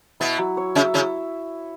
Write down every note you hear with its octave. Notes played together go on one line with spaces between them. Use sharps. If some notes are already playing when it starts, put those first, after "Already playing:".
B2 B3 E4
F#3
C#5
C#3 C#4 E5
C#3 C#4 E4